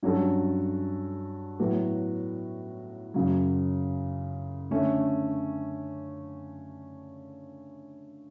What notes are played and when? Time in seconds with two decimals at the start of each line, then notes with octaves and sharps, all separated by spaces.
0.03 G2 F#3 C#4 F#4 A4
1.59 A2 F#3 B3 F#4
3.14 F#2 C#3 F#3
4.71 D3 A3 C#4